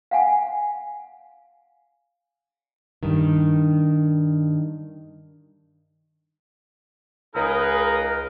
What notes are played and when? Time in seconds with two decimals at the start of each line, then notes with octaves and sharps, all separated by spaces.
0.11 F5 F#5 G#5
3.03 G2 D#3
7.35 C#2 D#4 G#4 A#4 B4